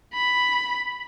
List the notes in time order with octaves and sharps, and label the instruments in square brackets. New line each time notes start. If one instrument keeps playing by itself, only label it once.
[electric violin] B5